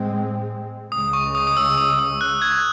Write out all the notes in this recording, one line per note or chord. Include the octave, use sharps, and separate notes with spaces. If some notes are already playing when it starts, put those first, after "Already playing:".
Already playing: A2 G#3 C4
C#2 C#3 G#3 D#6
C#6
D#6
D#6
E6
D#6
E6
F#6
G#6